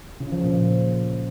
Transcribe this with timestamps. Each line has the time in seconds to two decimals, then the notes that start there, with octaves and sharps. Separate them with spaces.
0.20 C#3
0.32 F3
0.44 A#2